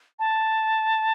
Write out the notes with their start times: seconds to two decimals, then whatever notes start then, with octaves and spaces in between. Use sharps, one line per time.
0.19 A5